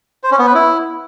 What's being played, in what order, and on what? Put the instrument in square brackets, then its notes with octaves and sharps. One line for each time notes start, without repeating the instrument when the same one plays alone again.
[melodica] C5
C#4
B3
B4
E4